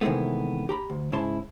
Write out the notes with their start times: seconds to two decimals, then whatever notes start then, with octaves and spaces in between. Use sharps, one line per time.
0.01 C3 D#3 E3 G#3 A3 B3
0.69 G4 A#5 B5
0.90 D2
1.12 G#2 C#3 E4 A5 C6